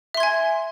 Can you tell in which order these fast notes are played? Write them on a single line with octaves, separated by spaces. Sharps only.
E5 C6 G#6 G#5